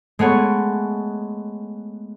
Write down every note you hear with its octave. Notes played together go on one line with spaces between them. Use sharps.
G#3 A3 B3 C#5